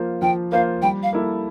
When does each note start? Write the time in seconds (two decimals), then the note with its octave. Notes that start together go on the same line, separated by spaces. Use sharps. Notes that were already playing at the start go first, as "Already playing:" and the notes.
Already playing: F3 A#3 F4 C5
0.22 F3 G5
0.52 A#3 F4 C5 F5
0.82 G3 G5
1.03 F5
1.13 A#3 E4 A4